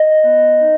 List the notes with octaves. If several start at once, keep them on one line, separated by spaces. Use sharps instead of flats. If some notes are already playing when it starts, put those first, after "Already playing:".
Already playing: D#5
B3
D#4